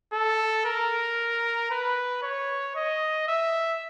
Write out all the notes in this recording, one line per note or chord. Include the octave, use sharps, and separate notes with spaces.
A4
A#4
B4
C#5
D#5
E5